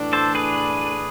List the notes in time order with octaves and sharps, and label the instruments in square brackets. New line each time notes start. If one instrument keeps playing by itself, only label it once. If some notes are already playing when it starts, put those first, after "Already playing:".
Already playing: [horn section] A2 E3 A3 D4
[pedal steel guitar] A4 C5
G#4 B4